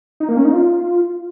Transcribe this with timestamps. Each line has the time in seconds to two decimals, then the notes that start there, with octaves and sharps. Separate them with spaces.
0.20 D#4
0.29 A#3
0.37 C#4
0.45 D#4
0.53 F4